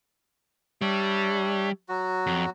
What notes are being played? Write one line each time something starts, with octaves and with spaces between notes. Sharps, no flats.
G3 D4 C#5 E5
F#3 F#4
F2